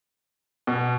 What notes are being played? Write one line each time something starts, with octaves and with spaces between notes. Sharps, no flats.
B2